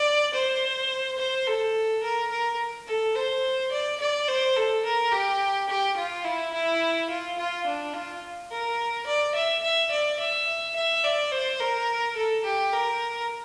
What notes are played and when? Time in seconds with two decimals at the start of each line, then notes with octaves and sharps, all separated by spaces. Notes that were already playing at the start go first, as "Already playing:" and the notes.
Already playing: D5
0.34 C5
1.18 C5
1.47 A4
2.03 A#4
2.31 A#4
2.87 A4
3.15 C5
3.72 D5
4.00 D5
4.28 C5
4.56 A4
4.85 A#4
5.12 G4
5.69 G4
5.97 F4
6.25 E4
6.53 E4
7.10 F4
7.38 F4
7.66 D4
7.94 F4
8.51 A#4
9.07 D5
9.35 E5
9.63 E5
9.91 D5
10.19 E5
10.76 E5
11.04 D5
11.32 C5
11.60 A#4
12.17 A4
12.44 G4
12.73 A#4